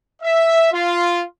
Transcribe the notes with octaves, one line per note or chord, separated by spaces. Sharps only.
E5
F4